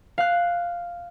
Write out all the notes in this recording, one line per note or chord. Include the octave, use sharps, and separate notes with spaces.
F5 F#6